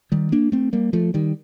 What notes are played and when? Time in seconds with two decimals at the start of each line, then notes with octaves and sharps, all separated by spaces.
0.12 D#3 G3
0.32 A#3 D4
0.52 A3 C4
0.73 G3 A#3
0.93 F3 A3
1.14 D#3 G3